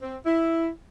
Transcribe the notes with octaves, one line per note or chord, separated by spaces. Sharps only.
C4
E4